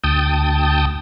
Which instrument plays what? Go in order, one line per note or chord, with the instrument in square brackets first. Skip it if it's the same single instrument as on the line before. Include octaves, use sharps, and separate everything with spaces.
[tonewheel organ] D2 G5 A5 D#6